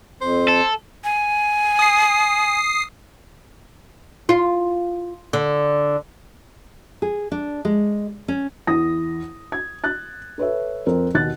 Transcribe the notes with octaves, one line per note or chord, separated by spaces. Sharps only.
F2 C5
A4
G#5
D#6 C7
F4
D3
G#4
D4
G#3
C#4
E2 E3 D#6 A#6
G#6
F#6 A6
A4 B4 C#5 E5
F2 C4 A#4
D#2 B2 F#6 A6